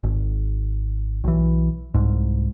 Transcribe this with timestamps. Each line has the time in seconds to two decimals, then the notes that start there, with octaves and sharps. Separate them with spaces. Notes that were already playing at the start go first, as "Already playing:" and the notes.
0.03 G#1
1.24 B1 E3
1.94 C2 G#2